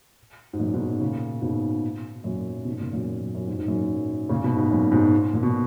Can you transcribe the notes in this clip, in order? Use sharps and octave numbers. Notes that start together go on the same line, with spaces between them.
G#2
F#2 A#2
G#2 B2
A#2 C#3
G#2 B2
F#2 A#2
G#2 B2
A#2 C#3
F#2 A#2
F#2
F#2
G#2
G#2
F#2 A#2
A#2 C#3
G#2 B2
G#2
F#2 A#2
G#2 B2
A#2
B2